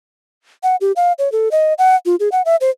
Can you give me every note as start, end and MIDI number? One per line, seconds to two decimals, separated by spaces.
0.63 0.76 78
0.81 0.92 67
0.96 1.13 77
1.19 1.31 73
1.32 1.49 69
1.51 1.74 75
1.78 1.96 78
2.06 2.16 65
2.20 2.29 68
2.32 2.42 78
2.45 2.56 76
2.61 2.70 72